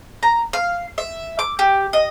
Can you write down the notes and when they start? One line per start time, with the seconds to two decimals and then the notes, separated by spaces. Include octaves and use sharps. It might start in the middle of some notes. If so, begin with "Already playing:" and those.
0.23 A#5
0.53 F5
0.98 E5
1.39 D6
1.59 G4
1.93 D#5